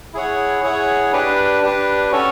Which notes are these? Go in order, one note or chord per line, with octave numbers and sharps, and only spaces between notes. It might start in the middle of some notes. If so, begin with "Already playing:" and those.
E4 G#4 C#5 F#5
E4 G#4 C#5 F#5
D4 G4 B4
D4 G4 B4
C#4 F#4 A4 C#5